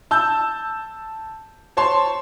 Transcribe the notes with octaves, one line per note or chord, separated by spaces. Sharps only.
A5 E6 G6
C5 C#5 A5 C6